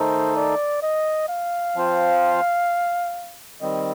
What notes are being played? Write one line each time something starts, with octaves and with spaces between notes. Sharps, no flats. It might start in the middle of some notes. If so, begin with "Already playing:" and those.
Already playing: D#3 A3 D#4 A4 C5
D5
D#5
F5
F3 C4 F4 C5
D#3 G3 C4 D#5